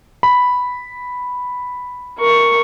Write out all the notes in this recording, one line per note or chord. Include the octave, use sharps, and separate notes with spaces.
B5
A#4 C#6